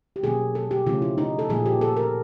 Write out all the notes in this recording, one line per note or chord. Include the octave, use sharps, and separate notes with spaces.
G4
B2 F#3 A#3 C#4 G#4
A4
G4
C#3 F3 A3 C#4 F4
E4
D#4
A4
A#2 F3 A#3 G#4
G4
A4
A#4